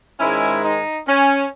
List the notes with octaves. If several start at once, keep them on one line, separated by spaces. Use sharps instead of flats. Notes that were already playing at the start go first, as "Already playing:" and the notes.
G#2 D#3 G#3 C#4 E4
D#4
C#4